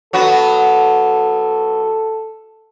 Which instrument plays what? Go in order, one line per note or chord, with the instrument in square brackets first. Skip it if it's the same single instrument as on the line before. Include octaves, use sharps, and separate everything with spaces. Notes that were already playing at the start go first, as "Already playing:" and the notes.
[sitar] F#3 B3 F#4 [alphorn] A4